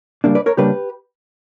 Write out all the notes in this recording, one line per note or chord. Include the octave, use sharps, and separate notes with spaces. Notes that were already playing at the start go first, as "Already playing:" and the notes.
C#3 G3 A#3 D4
B4 D5
A#4 C#5
C#3 G3 A#3 D4 G4 B4